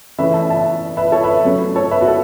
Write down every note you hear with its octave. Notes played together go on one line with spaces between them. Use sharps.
C#3 E3 A3 C#4 B4 E5
E5 A5
E5 A5
B4 E5
A4 C#5
B4 E5
C#3 F#3 A3 C#4
A4 C#5
B4 E5
F#4
A4